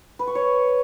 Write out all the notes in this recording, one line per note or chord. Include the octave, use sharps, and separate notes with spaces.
B4
C#6
C#5